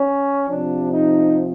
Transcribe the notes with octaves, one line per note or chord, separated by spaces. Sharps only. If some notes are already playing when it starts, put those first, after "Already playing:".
Already playing: C#4
C3 F3 D4
D#4